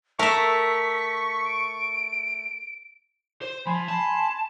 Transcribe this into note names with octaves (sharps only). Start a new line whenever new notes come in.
A3 A#4 E5 C#6 B6
D7
C5
F3 G#5 B5 C6
A5